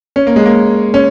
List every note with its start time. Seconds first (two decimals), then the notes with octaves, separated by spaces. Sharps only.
0.16 C#4
0.27 A#3
0.36 G#3
0.46 A#3
0.94 C#4